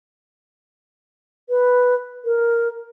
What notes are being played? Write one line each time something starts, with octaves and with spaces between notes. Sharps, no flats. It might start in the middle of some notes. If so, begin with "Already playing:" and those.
B4
A#4